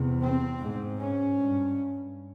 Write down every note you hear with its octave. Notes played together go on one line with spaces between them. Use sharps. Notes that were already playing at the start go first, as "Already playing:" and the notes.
Already playing: E2 C3
C4
G#2
C#4
G2